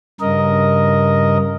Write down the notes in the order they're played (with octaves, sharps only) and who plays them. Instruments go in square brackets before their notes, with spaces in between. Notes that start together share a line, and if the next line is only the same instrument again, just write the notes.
[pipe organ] G2 C#3 A#4 D#5